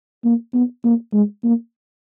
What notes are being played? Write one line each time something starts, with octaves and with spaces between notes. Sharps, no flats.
A#3
B3
A#3
G#3
A#3